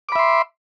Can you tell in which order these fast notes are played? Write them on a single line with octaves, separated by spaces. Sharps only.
D6 B5 E5 C6